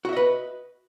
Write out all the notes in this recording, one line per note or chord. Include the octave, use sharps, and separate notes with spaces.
F#4 B4 D#5 E5